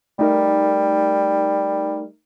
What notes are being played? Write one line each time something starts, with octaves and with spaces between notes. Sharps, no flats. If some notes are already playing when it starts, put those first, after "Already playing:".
G3 A3 D#4 A#4